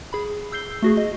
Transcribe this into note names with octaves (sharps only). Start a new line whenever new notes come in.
G#4 B5
E6 G6 C7 G7
A3 F#4 G#4
D#5